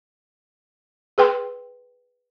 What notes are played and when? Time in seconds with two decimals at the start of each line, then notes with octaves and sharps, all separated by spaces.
1.18 G#4 B4 G5 C6